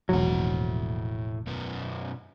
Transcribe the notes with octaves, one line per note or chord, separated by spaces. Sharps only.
E1 A#1 A2 F#3 F#5
F#2 B2 B3